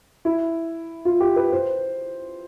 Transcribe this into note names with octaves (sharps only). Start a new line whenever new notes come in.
E4
F4
G4
B4
C5